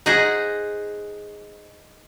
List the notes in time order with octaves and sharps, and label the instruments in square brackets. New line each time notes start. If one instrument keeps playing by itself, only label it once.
[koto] D#4 G#4 C5 D#5 F#5 G#5